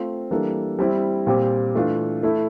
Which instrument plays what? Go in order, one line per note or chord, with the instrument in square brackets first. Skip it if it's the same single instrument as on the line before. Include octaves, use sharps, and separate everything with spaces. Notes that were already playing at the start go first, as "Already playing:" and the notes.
Already playing: [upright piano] A3 C4 F4 C5
E3 G3 A#3 D4 A4
G3 C4 E4
A#2 G3 C4 G4
E3 A3 D4 F4
A3 E4 A4